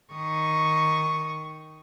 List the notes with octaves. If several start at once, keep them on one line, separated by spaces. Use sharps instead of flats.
D#3 C#6 D#6